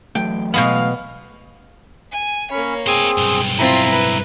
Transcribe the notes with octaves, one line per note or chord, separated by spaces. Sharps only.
E3 F#3 A3 G5
B2 G#3 B3 F5
G#5
A#3 C#4 C#5 B5
C4 G#4 C5 G#5
B1 G2 G5
C4 E4 F4 A#5 B5
B4